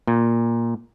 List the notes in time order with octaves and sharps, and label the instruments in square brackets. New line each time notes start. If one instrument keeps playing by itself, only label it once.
[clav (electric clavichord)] A#2